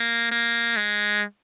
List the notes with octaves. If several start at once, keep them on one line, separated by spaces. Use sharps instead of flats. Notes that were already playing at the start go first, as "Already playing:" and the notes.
Already playing: A#3
A#3
G#3